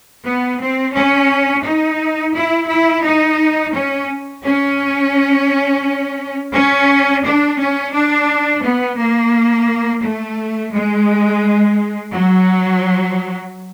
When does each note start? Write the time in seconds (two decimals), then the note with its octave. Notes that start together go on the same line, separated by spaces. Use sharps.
0.24 B3
0.60 C4
0.94 C#4
1.64 D#4
2.34 E4
2.69 E4
3.04 D#4
3.74 C#4
4.44 C#4
6.52 C#4
7.23 D4
7.58 C#4
7.92 D4
8.62 B3
8.97 A#3
10.02 A3
10.71 G#3
12.11 F#3